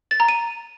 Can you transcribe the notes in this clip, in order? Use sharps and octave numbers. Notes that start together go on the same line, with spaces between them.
A6
A#5
D#7